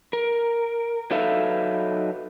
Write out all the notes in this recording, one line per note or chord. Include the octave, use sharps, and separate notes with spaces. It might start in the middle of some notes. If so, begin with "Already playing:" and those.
A#4
F#3 D#4 A4 B4 E5 F5